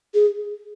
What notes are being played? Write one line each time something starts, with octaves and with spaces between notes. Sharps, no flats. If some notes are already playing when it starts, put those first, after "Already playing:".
G#4